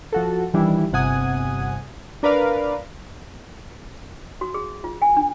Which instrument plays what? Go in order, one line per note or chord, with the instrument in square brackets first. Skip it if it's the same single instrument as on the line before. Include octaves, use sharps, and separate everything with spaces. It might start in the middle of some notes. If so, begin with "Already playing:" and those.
[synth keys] F3 F#4 A4
D#3 E3 G3 D4 E4
G1 C3 F#5 G#5 D#6
D4 A#4 B4 D5 F5
[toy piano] F#4
G#4
F4
G#5
D4